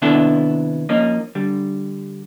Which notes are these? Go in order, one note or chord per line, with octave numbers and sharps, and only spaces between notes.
C3 D#3 B3 D4 E4 A4
F3 A#3 C#4 D#4
D3 G3